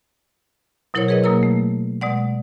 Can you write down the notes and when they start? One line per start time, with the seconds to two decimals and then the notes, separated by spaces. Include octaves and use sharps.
0.94 B2 F#3 E4 A#4 C5 C#5
1.08 G#4 A#4 B4 C#5 D#5
1.24 B2 F#3 A#3 A#4 A#5 E6
1.43 A3
2.01 B2 G#3 D5 F#5